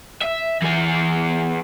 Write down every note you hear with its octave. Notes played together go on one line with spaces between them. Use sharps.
E5
E3 G#4